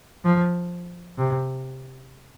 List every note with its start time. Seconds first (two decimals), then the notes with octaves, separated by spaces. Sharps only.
0.25 F3
1.18 C3